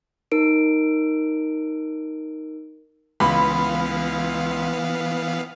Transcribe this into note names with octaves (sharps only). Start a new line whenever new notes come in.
D#4 A#4 D7
C#2 E3 B3 F5 B5